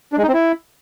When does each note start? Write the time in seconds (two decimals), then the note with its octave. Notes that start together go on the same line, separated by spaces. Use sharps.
0.13 D4
0.18 G#3
0.23 D#4
0.28 C4
0.33 E4